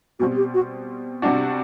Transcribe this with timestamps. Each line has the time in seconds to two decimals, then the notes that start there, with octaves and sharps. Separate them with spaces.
0.19 B2 G3 C4 F#4
0.37 G4
0.54 F#4
1.22 C3 G3 D4 F#4